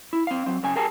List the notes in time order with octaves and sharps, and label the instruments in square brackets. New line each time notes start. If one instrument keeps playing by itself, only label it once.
[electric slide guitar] E4
C4 F5
F#3 C4
F#2 C#3 G#5
G4 G#4 A#4 G#5 A5